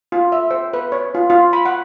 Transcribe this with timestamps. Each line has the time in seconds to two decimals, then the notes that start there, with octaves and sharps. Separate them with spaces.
0.12 F4
0.32 E5
0.51 C5
0.73 B4
0.92 C#5
1.15 F4
1.30 F4
1.53 B5
1.65 F#5